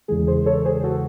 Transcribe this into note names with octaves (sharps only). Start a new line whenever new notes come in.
E2 C#3 E3 G#3 G#4
G#4 C5
A4 C#5
G#4 C5
F#4 A4